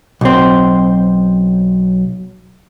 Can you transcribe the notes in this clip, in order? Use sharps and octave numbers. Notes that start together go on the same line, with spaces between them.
B1 C4